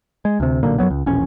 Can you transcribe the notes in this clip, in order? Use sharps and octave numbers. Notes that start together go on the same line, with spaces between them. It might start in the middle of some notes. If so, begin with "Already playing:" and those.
G#3
D2 C3
B1 A#2 D3 A#3
F#2 A2 F#3 B3
C#2
E1 A#1 C#4